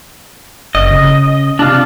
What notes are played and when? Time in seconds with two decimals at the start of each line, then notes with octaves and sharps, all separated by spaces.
0.75 F#1 D#5
0.91 C#3
1.59 C3 D4 F4